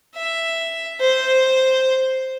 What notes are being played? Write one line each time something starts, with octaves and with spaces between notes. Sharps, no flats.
E5
C5